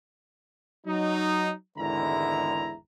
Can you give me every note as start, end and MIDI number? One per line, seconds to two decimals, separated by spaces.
0.87 1.52 54
0.87 1.52 63
1.78 2.75 32
1.78 2.75 40
1.78 2.75 50
1.78 2.75 56
1.78 2.75 64
1.78 2.75 82